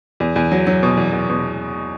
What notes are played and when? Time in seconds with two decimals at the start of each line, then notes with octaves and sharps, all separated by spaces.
0.20 E2
0.36 E2
0.52 F#3
0.67 F#3
0.83 B2
0.97 E2
1.13 E2
1.29 B2